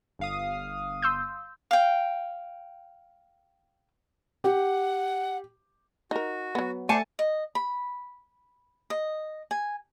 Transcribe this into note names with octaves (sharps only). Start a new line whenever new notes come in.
G1 F5 D#6
C6 E6 G6
F5 G5
G4 F#5
D#4 F#4 A#4
F#3 B3
A3 C5 D5 G#5 A5 C#7
D#5
B5
D#5
G#5